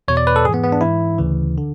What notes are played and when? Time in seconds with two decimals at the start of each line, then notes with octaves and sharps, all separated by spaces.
0.08 E2 B2 C#5
0.17 D5
0.27 B4
0.36 A4
0.45 G#2 G#4
0.49 E3 B3
0.64 B3
0.72 D4
0.81 G#2 E3 E4
1.18 D2 C#3 E3
1.58 D3